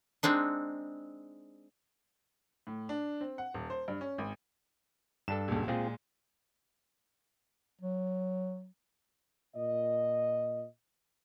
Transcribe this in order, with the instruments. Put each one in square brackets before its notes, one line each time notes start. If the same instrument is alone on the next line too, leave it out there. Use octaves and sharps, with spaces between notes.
[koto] G#3 C4 D4 D#4
[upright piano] A2
D4
C4
F#5
D#1
C5
G2
C#4
G#1
[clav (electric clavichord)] G2 D4 A4 [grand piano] E7
[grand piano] D#1 C#2
[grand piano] A#2 G#3 [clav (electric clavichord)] C4 F4 G#4
[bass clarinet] F#3
[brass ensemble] A#2 D#5